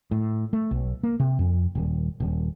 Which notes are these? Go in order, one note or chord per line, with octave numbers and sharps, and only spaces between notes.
A2
A3
B1
A#3
C3
F2
D#1
D#1